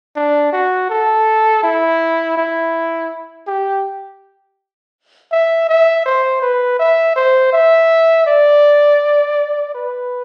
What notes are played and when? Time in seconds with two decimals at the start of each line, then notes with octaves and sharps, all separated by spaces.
0.16 D4
0.53 F#4
0.90 A4
1.63 E4
2.37 E4
3.47 G4
5.32 E5
5.69 E5
6.06 C5
6.42 B4
6.80 E5
7.16 C5
7.53 E5
8.27 D5
9.75 B4